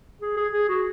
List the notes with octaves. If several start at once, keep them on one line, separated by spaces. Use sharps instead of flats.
G#4
G#4
G#4
F#4